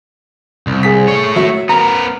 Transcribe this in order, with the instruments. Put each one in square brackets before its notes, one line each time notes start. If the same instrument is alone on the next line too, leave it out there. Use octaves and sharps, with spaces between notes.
[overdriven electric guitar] C2
[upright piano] G#4 B6
[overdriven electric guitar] A3 C#5
[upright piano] F#3 E5
[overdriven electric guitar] B3 A#4 [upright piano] A#5